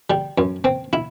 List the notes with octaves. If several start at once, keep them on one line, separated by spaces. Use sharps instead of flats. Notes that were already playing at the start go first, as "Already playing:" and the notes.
G3
F#2
C4
E4